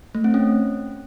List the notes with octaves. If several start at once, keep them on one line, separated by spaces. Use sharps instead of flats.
A3
C4
C#4